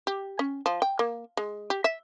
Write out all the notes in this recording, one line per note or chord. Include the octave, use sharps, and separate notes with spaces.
G4
C#4
F3
G5
A#3
G#3
G4
E5